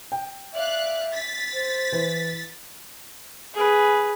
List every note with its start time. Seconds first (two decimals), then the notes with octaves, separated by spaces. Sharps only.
0.12 G5
0.54 D5 E5 F5 F#6
1.12 A6 B6
1.54 C5
1.92 E3 B4
3.54 G#4 B4